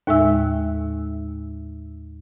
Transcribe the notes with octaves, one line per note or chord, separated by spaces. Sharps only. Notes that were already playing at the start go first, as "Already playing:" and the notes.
D#2 A2 G#3 E5 E6